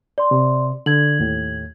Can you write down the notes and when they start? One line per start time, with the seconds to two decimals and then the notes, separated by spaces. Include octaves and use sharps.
0.18 D5 C6
0.31 C3
0.86 D3 G#6 F#7
1.19 D#2 A2